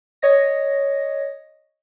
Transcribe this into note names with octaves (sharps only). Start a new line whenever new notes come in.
C#5 D#5 A#6